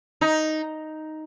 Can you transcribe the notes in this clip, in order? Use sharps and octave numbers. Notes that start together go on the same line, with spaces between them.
D#4